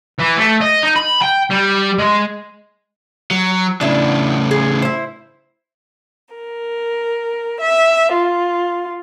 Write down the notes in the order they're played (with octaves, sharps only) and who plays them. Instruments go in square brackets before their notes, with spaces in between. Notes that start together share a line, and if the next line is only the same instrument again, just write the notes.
[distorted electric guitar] E3
A3
D#5
D#4
B5
G5
G3
G#3
[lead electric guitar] F#3
[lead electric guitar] A2 C#3 [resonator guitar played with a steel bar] D4 E4
[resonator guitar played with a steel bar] G#4
E4 C5
[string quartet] A#4
E5
F4